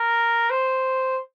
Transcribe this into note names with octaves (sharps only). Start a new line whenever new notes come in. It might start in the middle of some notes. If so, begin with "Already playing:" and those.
Already playing: A#4
C5